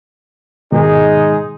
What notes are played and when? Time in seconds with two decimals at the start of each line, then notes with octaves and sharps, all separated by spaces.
0.72 G#2 B2 D#3 G#3 D#4 G#4